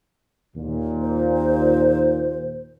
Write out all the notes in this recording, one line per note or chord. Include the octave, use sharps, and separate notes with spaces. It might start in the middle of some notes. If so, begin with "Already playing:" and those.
D#2 A#2
C5